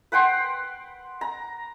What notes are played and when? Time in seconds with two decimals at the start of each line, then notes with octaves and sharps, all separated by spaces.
0.12 B4 F#5 G5 C6
1.21 A#5